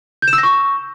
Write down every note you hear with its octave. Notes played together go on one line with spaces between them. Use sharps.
G6
E7
E6
A#6
C#6